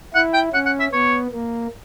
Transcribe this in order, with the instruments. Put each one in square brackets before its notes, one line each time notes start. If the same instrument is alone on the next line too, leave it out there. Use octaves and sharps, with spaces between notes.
[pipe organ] E4 [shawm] F#5
[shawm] G5
[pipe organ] C#4 [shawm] F#5
[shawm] F#5
E5
[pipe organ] B3 [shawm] C#5
[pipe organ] A#3